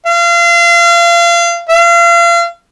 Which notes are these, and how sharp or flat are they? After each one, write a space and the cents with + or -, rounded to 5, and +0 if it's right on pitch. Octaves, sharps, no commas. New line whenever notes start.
F5 -30
F5 -35